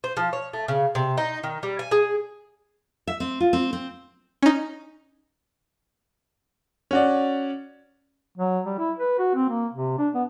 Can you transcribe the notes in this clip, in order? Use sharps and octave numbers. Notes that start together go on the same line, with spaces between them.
C5
F3
C#5
A3
C#3
C3
D#4
D#3
G3
G#5
G#4
E5
C4
F4
C4
C4
C#4 D#4
C#4 F#4 D5
F#3
G3
E4
B4
F#4
C4
A#3
C3
D4
B3